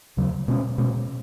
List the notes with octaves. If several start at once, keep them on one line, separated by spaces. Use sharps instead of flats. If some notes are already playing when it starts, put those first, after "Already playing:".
D#2 C#3 F#3
B2 G#3 C#4
B2 G#3 C#4